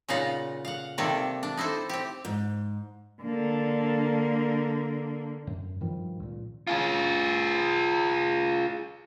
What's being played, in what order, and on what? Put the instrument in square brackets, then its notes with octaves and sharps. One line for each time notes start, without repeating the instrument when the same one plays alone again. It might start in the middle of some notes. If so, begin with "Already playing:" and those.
[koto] A#2 C#3 D#4 F4 F5 F#5
F5 F#5
C3 D#3 G3 A#3 C4 A4
D4
D#4 E4 A4 C5
C4 G4
[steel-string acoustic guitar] G#2
[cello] D3 A#3
[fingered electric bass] F#2
G2 D#3 F3 G3
C#2 A#2
[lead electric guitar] F4 G#4